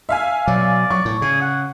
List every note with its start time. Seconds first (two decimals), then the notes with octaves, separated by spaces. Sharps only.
0.09 E5 F5 G#5
0.47 B2 F#3 D5
0.90 F#3 C#6
1.05 A2
1.22 C#3 G#4
1.41 F#5